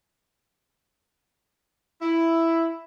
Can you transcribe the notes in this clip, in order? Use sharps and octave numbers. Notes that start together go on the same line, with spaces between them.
E4